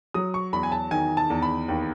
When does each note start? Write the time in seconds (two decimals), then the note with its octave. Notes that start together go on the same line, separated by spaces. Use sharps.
0.14 F#3 D#6
0.34 C#6
0.53 E2 B5
0.63 G#5
0.72 A5
0.91 D#3 G#5
1.17 A5
1.30 E2
1.42 B5
1.68 D#2